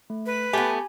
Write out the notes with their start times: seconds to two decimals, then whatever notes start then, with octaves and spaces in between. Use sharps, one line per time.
0.10 A3
0.26 B4
0.53 A3 B3 G4 G#5